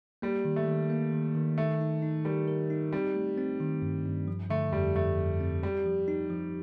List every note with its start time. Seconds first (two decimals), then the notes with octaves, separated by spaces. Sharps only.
0.22 G3 A#3
0.45 D#3
0.56 A3
0.68 D#3
0.90 A#3
1.13 D#3
1.35 D#3
1.58 A3 D#4
1.81 D#4
2.02 D#4
2.25 G3 A#4
2.48 A#4
2.70 D#4
2.92 G3 C4
3.16 A3
3.37 C4
3.60 D#3
3.82 G2
4.05 G2
4.28 F3
4.50 D3 A3
4.72 F2 G3
4.95 F2 A3
5.18 F2
5.40 C4
5.63 G3 G4
5.86 F3
6.08 D#4
6.30 F3